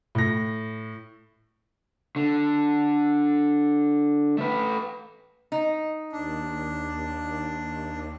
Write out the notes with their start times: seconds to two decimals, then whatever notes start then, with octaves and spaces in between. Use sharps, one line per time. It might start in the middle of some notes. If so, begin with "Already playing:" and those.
0.15 A2 A#6
2.16 D3
4.38 A3 B4
5.52 D#4
6.12 D#2 D4